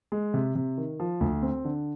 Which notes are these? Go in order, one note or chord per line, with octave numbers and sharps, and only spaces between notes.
G#3
C3
C3
D#3
F3
D2
C4
D3